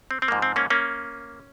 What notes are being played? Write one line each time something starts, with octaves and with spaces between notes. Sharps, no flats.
C4
C4
G#2 F3 A#3
C4
A#3 C#4
A#3 C#4